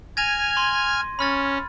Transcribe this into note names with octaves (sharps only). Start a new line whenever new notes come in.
G#5 F6 G#6 A#6 D#7
C6
C#4 B5 F6 A6